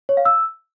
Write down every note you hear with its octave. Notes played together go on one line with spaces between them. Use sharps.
C#5
F5
E6